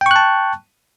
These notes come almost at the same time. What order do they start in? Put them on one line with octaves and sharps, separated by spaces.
G5 C#6 F#6 A5